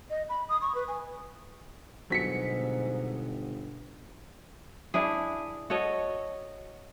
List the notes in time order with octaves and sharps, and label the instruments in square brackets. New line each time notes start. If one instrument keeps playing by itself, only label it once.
[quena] D#5
B5
D#6
C#6
B4
G#5
[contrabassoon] G1 [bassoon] G#2 [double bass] B2 [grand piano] F#3 B6 C#7
[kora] D4 E4 G#4
F#4 A4 C#5 D#5